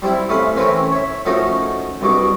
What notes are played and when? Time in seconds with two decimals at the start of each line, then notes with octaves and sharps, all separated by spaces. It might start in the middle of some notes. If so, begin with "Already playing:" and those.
0.02 G3 C4 E4
0.29 C3 A3 C#4 F5 B5 D#6
0.56 E3 A3 C4 C#4 A#4 B4
0.92 C#5 E5
1.25 F3 A3 C#4 D#4 F#4 A#4
2.01 C2 G2 B2 C#6 D6